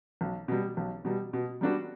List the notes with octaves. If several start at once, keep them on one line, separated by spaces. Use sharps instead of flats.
B1
B2 G3
B1
B2 G3
B2
G3 B3 D4 F#4